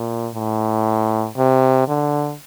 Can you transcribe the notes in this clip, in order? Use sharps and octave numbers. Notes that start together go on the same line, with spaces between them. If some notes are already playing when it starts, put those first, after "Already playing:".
Already playing: A#2
A2
C3
D3